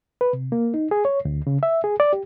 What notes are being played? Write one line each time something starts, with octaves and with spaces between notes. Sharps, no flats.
B4
C3
A#3
D#4
G#4
C#5
D2
C#3
E5
G#4
D5
G4